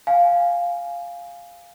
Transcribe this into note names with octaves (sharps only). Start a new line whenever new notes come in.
F5 G#5